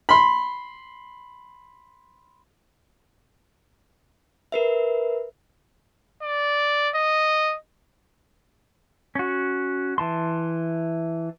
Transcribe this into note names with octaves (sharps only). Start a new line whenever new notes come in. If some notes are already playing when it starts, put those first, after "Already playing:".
B5 C6
A#4 B4 E5
D5
D#5
C#4 F#4
E3 A5 C6